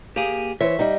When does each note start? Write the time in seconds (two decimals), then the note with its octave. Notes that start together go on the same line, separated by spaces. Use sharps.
0.16 A#3 G4 G#4
0.61 E3 C5 C#5 E5
0.79 G3 D#4